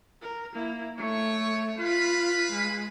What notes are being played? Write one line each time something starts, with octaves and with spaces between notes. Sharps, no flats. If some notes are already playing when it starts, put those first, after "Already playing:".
A#4
A#3 E4
A3 C#5 C#6
F4 B4 F5 B5
G#3